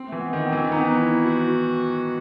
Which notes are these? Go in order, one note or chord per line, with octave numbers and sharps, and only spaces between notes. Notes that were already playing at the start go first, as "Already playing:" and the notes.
Already playing: C4
E3 A3
B3
D#3 B3
C4
E3
C4
B3 D#4
E4
F#4